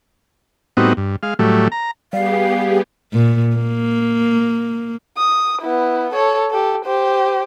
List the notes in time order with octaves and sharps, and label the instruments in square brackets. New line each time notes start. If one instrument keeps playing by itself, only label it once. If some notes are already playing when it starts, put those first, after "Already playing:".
[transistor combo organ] A2 G3 B3 C4 D#4 F#4
G2
G#3 F5
A2 F#3 G3 A3
A#5
[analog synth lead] G3 [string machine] B3 G4 G#4 [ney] F5
[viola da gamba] A#2
A#3
[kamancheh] D#6
B3 E4
A4 C#5
G4 A4
G4 C5